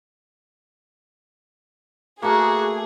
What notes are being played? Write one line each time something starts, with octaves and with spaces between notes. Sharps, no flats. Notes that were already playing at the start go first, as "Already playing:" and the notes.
A3 A#3 F#4 G#4